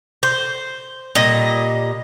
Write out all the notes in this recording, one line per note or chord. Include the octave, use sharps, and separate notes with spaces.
C5
A#2 G3 D#5